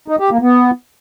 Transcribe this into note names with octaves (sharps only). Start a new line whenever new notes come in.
D#4
G4
A#3
B3